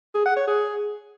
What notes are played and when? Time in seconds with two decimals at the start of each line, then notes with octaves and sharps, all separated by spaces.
0.15 G#4
0.26 F#5
0.36 C#5
0.47 G#4